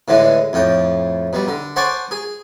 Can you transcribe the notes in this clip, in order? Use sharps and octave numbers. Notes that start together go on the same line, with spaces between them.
A2 D3 E3 G#3
F2 A2 G5
B2 G3
D3
C5 F#5 G#5 A5 C#6 D6
G#4